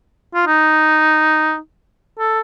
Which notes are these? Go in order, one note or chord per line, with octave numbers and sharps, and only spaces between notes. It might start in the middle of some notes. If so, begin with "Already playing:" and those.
F4
D#4
A4